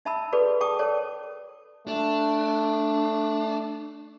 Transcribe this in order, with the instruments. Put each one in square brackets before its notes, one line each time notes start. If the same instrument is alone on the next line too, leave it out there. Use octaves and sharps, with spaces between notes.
[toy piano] D#4 E5 A5 B5 E6
F#4 G#4 A4 B4 D5
G#4 G5 A5 D6 D#6
A4 A#4 C#5 D5 G5 A5
[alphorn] A3 [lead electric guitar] D4